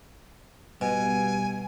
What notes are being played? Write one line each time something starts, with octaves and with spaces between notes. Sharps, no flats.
B2 G3 G#5